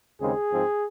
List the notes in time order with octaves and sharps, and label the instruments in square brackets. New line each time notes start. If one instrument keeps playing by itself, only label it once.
[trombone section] D#2 C#3 G#3 C4 G#4
G#2 F3 C4